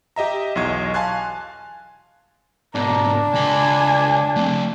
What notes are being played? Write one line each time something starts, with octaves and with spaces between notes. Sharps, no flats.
G4 D#5 E5 A#5
B1 E2 D#5 C#6 G#6
F5 G#5 A5 C6 F#6 G#6
G#2 B2 D4 A#4
C#2 G#5 B5
A3 C4